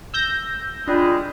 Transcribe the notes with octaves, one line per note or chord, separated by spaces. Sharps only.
E6 G6 A#6
G3 G#3 D4 F4 B4